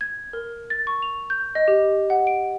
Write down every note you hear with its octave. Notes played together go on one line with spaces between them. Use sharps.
G#6
A#4
A6
C#6
F7
G6
D#5
G4
F#5
D7